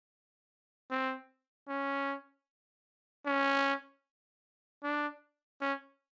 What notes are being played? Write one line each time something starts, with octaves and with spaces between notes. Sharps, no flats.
C4
C#4
C#4
D4
C#4